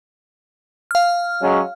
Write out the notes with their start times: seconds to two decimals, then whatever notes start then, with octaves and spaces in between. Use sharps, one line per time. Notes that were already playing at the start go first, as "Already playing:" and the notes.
0.91 F5 F6
1.41 F#3 G#3 C#4